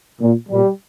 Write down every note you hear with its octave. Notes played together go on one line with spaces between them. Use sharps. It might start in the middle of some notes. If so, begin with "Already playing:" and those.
A#2
A#2 G3